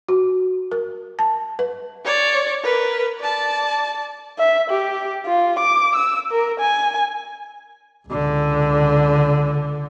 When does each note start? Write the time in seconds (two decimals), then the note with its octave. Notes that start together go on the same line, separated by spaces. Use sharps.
0.09 F#4
0.72 A#4
1.19 A5
1.59 B4
2.04 C#5 D5
2.64 A#4 B4
3.20 D5 A5
4.38 E5
4.70 G4
5.26 F4
5.59 D6
5.95 E6
6.31 A#4
6.60 G#5
8.07 C#2 D3